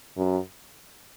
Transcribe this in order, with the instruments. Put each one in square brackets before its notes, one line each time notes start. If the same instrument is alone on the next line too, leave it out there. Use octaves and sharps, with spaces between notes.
[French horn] F#2